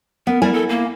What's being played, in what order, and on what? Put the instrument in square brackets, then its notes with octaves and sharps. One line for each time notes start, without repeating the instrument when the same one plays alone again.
[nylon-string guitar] B3 [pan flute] A#4
[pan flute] G3 [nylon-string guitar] E4 A#4 G#5
[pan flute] A4
A#3